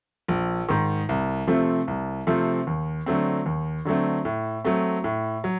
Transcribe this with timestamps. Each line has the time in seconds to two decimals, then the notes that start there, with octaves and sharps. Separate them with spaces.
0.28 A#1
0.69 G#2 D#3
1.09 C2
1.47 C3 F3 A3 C4
1.88 C2
2.27 C3 F3 A3 C4
2.67 D#2
3.06 D3 F#3 A3 C4
3.46 D#2
3.85 D3 F#3 A3 C4
4.25 A2
4.65 F#3 A3 C4
5.04 A2
5.44 F#3